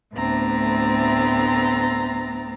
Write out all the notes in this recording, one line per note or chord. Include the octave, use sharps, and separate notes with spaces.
D2 A2 B3 C4 A#5 A6